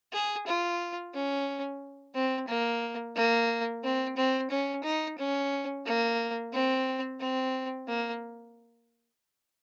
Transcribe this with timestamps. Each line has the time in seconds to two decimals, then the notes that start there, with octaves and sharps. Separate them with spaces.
0.13 G#4
0.47 F4
1.14 C#4
2.15 C4
2.48 A#3
3.16 A#3
3.84 C4
4.17 C4
4.50 C#4
4.84 D#4
5.18 C#4
5.86 A#3
6.53 C4
7.20 C4
7.87 A#3